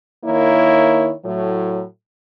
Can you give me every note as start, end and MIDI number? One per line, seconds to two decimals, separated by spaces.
0.25 1.12 51
0.25 1.12 58
0.25 1.12 64
0.25 1.12 73
1.25 1.83 45
1.25 1.83 54